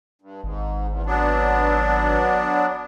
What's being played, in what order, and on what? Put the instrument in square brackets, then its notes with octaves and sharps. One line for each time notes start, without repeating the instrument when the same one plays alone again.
[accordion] G2
[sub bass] G#1 [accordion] G#2
[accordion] E2
F#3 B3 D4